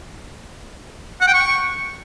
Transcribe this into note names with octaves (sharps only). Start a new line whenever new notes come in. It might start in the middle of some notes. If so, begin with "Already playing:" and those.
F#5
G5
C#6